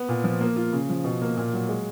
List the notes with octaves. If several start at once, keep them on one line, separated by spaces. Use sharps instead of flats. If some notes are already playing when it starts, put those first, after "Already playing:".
Already playing: B3
A#2
F3
A#3
F4
C#3
F3
B2
A#3
A#2
F#3
G#3